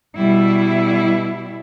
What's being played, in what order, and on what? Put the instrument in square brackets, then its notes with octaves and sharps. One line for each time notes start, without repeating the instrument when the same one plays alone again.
[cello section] B2 G3 E4